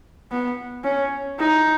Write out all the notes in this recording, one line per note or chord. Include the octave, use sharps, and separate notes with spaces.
B3
C#4
D#4